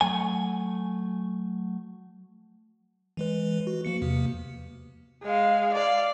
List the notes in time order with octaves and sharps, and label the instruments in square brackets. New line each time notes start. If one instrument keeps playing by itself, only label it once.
[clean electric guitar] F#3 A3 G#5
[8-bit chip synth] E3 G#3 B4
F#4
F3 A#3 C#7
E2 C3 A#3
[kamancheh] G#3 F5
D5 F5